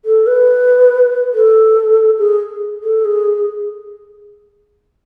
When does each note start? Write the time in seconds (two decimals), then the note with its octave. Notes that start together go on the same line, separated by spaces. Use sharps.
0.05 A4
0.26 B4
1.33 A4
2.18 G#4
2.83 A4
3.04 G#4